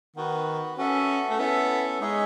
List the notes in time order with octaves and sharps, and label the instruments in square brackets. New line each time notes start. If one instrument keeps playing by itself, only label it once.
[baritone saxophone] D#3 [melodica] B3 F#4 B4
[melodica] B3 F#4 A4 E5 [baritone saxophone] C#4
[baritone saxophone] A3
[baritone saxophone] B3 [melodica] C#4 E4 A4 E5
[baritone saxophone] G#3 [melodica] D#4 G#4 C#5 E5